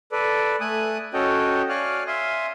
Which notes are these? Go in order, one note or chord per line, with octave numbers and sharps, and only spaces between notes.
A4 B4 D5
A3 G#5 D#6 F#6
C#4 F#4 A4 C#5 D#5 G5
C#5 D5 F5 G#5 F6 F#6
E5 F5 G#5 C6 D#6